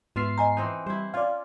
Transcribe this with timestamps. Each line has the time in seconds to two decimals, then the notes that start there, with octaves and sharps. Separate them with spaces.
0.16 G#2 B3 F4 E5 F5 C7
0.38 D#5 G#5 A#5
0.57 E3 C4 D#4
0.86 G3 E4 C5
1.14 C#4 F4 D5 F5